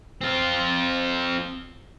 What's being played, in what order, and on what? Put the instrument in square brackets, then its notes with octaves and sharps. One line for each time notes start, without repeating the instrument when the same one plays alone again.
[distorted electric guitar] C4 F4